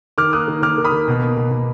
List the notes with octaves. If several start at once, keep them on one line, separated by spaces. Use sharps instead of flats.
D#3 D6 F6
A#3 D#6 F#6
D#3
D#3 D6 F6
D#3
B5 D#6
D#3
B2
A#3
B2
B2